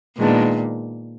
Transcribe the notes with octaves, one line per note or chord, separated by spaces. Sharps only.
A#2 D#3 G#3 B3 D4